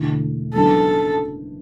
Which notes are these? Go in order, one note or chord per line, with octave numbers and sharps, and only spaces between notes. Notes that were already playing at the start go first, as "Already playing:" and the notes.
Already playing: E1 D2 D3 A3 E4
F#1 F#2 E3 B3 D4 A4